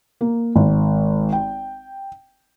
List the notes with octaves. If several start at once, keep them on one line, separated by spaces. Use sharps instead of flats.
A#3
G#1
G5